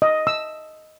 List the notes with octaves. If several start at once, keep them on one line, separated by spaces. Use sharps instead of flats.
D#5
E6